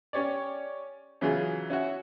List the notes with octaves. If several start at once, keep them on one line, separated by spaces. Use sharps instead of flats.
C#4 G4 C#5 D5
C#3 E3 F#3 F4 G#4
C#4 E4 F#4